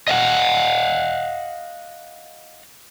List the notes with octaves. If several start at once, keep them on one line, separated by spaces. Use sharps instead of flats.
D#5 F5 F#5